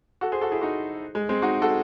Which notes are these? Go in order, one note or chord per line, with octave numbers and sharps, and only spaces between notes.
F#4 A4
G#4 C5
F#4 A4
E4 G#4
D#4 F#4
G#3
G#3 C4
D#4 F#4
F#4 A4